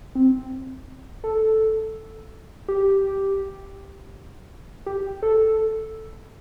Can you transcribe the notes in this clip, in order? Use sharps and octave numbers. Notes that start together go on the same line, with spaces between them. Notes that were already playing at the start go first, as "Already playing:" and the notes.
C4
A4
G4
G4
A4